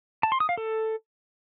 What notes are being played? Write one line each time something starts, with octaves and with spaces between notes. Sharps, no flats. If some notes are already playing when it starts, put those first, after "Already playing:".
A5
C6
D#6
F5
A4